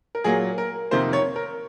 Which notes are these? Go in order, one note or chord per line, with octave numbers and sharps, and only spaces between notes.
A#4
A#2 F#3 A#3 G#4
A#4
F2 C3 D#3 A#3 C5
C#5
A#4